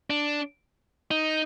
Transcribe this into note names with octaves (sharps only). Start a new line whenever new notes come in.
D4
D#4